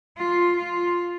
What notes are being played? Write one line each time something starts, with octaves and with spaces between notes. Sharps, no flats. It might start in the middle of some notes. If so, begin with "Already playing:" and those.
F4
F4